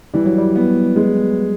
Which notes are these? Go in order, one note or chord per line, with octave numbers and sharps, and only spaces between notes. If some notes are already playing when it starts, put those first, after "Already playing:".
E3 G3
F#3
G3
B3
G#3